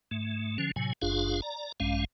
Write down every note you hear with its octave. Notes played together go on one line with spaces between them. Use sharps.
G#2 A3
D3 F3 C#4
A2 C3 F#3 G#5
F#1 F#2 D4 F4 G#4 F5
D5 A#5
A#1 G2 G#3 C#4 F5